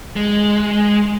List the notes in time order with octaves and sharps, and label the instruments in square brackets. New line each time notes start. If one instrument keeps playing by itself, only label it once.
[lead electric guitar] G#3